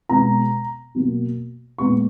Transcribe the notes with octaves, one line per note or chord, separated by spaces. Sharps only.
B2 G#3 B3 A#5
B2 F#3 A#3
A#2 G#3 B3 C#6